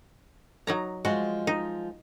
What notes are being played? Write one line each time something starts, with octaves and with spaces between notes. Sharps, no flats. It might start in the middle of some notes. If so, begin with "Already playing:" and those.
F#3 D#4 A#5
F3 G#3 F#4
D#4